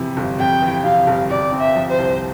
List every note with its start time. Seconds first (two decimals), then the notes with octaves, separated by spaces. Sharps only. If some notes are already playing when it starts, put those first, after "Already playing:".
Already playing: F2 C3 E3
0.17 G1
0.39 F2 G5
0.62 E3
0.84 C3 F5
1.07 G1
1.30 C3 D5
1.52 C4
1.61 E5
1.76 F3
1.90 C5
1.98 C2